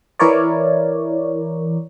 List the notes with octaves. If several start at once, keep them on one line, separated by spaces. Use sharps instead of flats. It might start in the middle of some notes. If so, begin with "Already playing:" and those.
E3 E4 A#4 C#5 D5